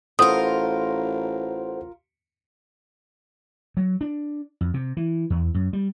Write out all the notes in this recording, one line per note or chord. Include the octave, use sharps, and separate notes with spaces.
A1 F4 A4 A#4 C5 F#5 D#6
F#3
D4
F2
C3
E3
E2
F#2
G3